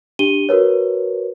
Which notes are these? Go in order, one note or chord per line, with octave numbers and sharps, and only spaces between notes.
D4 G4 D#7 G7
F#4 A#4 B4 C#5